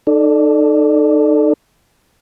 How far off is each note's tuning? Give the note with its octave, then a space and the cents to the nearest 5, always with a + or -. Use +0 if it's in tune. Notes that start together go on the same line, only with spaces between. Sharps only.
D#4 -25 A4 +0 D5 +0